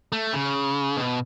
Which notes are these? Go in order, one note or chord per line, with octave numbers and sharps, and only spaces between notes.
A3
C#3
B2